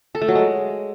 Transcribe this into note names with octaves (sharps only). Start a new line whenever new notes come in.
A4
A3
F#3
G#3